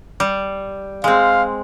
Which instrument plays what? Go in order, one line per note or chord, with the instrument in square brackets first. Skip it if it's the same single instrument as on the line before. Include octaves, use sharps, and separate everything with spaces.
[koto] G3
[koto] G#3 C4 [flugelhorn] F5